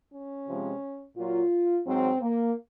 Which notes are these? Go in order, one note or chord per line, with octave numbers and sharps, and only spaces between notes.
C#4
C3 F3 G#3
A#2 F#3 F4
G#2 F#3 C4
A#3